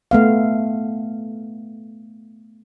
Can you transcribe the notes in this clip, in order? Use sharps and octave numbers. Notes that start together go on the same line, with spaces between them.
A3 B3 F5